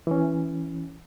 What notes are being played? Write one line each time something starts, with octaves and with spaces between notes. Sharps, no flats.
E3 C#4